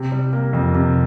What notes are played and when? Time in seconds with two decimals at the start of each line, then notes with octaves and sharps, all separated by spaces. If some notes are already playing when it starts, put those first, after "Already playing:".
Already playing: C3
0.12 G3
0.33 A#3
0.53 F2
0.74 C3